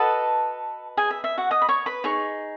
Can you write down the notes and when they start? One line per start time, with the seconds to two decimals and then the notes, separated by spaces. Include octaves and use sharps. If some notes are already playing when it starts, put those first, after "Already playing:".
Already playing: F#4 A4 B4 D#5 A5
0.97 G#4 G#5
1.11 E5
1.24 E5
1.38 F#4 F#5
1.51 D#5 D#6
1.62 B5
1.69 C#5 C#6
1.86 B4 B5
2.04 D#4 G#4 C#5 C#6